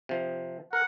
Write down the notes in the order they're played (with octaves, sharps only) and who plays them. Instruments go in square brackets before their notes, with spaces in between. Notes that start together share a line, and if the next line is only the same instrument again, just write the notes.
[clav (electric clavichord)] C3 F3
[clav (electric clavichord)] A#4 [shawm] F#5